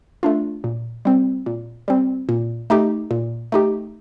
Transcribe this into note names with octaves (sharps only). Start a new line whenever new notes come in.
A3 D4 F4
A#2
G3 C4
A#2
G3 C4
A#2
A3 D#4 G4
A#2
A3 D#4 G4